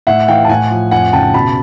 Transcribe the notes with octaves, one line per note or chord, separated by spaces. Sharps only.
A2 E5 F#5
E3 F5 G5
A5
A2 F#5 G#5
F3
F2 F#5 G#5
C#3 G5 A5
B2 A5 B5